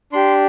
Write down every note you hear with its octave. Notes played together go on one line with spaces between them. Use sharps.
D4 G4 C6